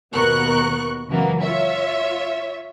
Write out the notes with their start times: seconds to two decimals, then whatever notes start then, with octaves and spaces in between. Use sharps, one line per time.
0.13 D#2 B2 B3 A#4 C#6 F#6
1.09 C#2 F#2 E3 F#3 A#3 B3
1.41 F4 C#5 E5